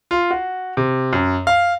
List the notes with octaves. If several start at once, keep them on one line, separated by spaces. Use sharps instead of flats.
F4
F#4
C3
F#2
F5